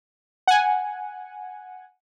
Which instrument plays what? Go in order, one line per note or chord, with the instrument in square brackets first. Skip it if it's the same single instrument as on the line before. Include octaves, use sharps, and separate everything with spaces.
[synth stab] F#5 G#5